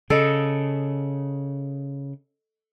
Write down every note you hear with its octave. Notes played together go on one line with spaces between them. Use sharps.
C#3 A4 D#5